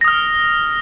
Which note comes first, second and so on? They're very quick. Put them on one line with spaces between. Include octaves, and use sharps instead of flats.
A#6 D#6 F6